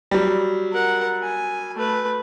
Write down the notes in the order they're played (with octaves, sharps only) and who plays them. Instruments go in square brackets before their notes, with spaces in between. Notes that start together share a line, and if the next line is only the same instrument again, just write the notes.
[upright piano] F#3 G3
[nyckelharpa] A#4 F#5
G#5
A3 B4